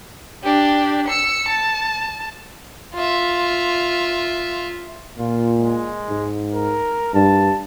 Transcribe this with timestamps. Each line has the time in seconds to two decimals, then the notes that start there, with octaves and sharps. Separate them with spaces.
0.44 D4 G4
1.08 E6 C#7
1.48 A5
2.94 F4 E5
5.18 A#2 F4
5.59 G#3
6.09 G#2
6.54 A#4
7.14 G2 A5